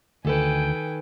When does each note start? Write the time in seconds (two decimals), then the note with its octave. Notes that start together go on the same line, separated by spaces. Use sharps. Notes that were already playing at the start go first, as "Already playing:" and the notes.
0.25 D2 D#3 A4 B4 G5 G#5